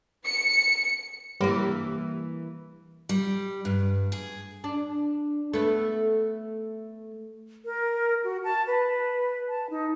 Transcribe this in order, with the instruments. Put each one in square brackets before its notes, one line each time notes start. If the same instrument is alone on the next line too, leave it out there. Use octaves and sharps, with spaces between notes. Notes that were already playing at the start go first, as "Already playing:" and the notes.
[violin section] C#7
[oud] E3 A#3 [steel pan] G3
[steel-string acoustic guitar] G3
G2
G#4
[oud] D4
A3 B3
[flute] A#4
F#4
A5
B4
A5
D#4